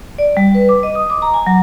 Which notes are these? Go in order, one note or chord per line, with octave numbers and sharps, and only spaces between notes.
D5
G3
B4
D6
D#5
D#6
D6
A#5
G#5
F#3